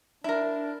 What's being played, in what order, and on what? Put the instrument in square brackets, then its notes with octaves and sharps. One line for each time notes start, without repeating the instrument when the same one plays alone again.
[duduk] D4 [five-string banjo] E4 A#4